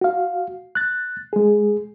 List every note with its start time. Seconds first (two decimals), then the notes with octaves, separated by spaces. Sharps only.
0.01 F#4 F5
0.75 F#6 A6
1.33 G#3 G#4